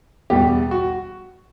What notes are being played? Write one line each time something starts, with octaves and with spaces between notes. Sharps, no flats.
E2 B2 G3 G4
F#4